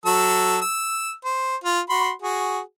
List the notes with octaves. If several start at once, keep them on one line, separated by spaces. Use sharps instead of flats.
F#3 A4 E6
E6
C5
F4
F#4 B5 C6
F#4 G#4